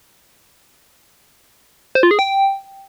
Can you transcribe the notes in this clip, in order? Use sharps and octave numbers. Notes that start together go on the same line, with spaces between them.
C5
F4
G#4
G5